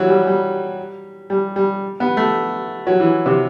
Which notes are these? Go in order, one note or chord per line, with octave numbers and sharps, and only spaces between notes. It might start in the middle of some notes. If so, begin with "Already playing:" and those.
Already playing: E3 F#3
G3
G3
G3
G3
B3
A3
F#3
E3
C3